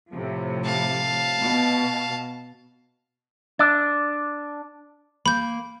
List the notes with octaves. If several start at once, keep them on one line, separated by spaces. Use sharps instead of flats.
A2 C3 F3
F5 A5
B2
D4 E6 A6
A#3 B5 G6